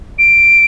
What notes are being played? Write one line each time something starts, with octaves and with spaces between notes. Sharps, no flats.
D7